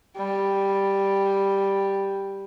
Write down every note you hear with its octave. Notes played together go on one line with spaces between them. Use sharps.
G3